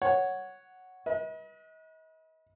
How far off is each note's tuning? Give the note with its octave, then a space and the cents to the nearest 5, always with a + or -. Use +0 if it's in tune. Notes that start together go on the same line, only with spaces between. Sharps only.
C#5 +0 F#5 +0
B4 -35 D#5 +40